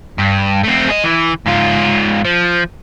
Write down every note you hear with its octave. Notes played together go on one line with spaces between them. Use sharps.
G2
A3 C4
G#4 D#5
E3
G#2 F4
F3